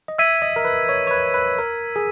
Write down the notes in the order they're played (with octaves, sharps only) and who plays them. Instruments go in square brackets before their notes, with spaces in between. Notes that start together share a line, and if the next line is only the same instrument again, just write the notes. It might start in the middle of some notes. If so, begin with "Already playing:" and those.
[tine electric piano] D#5
[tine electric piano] E5 [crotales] E6 G#6 B6 D#7
[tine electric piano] D#5
A#4
B4
C#5
C#5
B4
B4
A#4
G#4